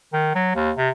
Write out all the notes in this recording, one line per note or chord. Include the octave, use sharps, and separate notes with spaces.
D#3
F#3
D#2
C3